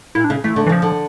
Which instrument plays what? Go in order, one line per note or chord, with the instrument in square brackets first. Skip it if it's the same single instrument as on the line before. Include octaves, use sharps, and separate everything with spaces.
[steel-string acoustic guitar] A#2 [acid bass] E4
[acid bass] D4
[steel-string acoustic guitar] C#3
[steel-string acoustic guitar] E3 [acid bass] A3
[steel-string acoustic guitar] D3
[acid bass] E3
[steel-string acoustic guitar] C#3 [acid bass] F3
[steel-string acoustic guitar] D3